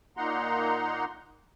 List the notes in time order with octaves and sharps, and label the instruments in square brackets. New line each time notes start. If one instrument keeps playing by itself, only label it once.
[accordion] A#2 A#3 D#4 F#5 A#5 C6